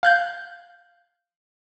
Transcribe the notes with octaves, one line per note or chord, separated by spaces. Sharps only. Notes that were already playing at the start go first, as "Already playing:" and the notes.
F5 F#6 G6